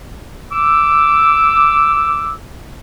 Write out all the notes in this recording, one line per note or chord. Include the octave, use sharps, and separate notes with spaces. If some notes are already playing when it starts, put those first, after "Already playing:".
D6 E6